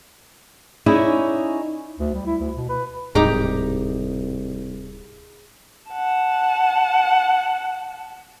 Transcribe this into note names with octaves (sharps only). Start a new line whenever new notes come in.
C#4 D#4 E4 G#4 C#5 D5
D2
G3
E4
D2
B2
B4
D1 C2 G#2 D#4 G4 G#4 A#5
F#5 A5